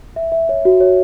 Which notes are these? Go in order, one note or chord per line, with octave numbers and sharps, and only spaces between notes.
E5
E5
C#5
F#4
C#5